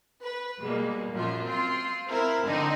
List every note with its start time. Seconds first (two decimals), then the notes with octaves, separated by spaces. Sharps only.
0.23 B4
0.59 B2 G3 G#3 A#3
1.11 F#2 A#2 F3 F4
1.44 C4 F4 C6
2.08 C4 E4 A#4 C5
2.46 D3 C4 D4 D#4